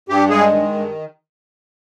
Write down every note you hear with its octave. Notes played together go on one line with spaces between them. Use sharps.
G2 G4
G#3 G#4
D#3
G2